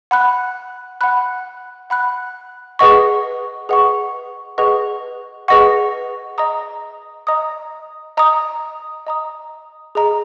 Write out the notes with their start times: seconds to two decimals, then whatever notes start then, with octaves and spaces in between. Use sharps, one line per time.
0.11 F#5 B5 F#6
1.01 F#5 B5 F#6
1.90 F#5 B5 F#6
2.79 G#4 B4 D#5 F#5 C#6
3.69 G#4 B4 D#5 F#5 C#6
4.58 G#4 B4 D#5 F#5 C#6
5.48 G#4 B4 D#5 F#5 C#6
6.38 D#5 A#5 D#6
7.27 D#5 A#5 D#6
8.17 D#5 A#5 D#6
9.07 D#5 A#5 D#6
9.95 G#4 D#5 A#5